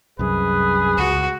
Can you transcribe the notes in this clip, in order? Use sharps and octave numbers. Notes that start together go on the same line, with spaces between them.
C2 F#2 G#4 B4
C#2 F#4